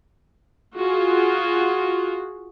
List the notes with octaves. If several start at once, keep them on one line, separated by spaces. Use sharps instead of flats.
F4 F#4 G#4